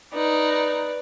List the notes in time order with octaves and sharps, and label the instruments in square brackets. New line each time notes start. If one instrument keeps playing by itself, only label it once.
[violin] D#4 [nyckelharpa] B4 D5